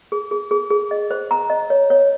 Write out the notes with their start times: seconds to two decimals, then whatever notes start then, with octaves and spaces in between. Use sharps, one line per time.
0.12 G#4
0.31 G#4
0.51 G#4
0.71 G#4
0.91 D#5
1.11 C5
1.31 A#5
1.50 D#5
1.70 C#5
1.90 C#5